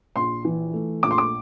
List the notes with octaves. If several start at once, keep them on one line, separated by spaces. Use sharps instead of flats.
A#1 C6
E3
A3
A#1 D6
C6
D6